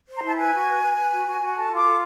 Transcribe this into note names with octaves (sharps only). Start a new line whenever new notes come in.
C5
A#5
E4 A5
B4 G#5
F#4
B4
B4
B4
F#4
F#4
F#4
A4 A5
F4
D6
A4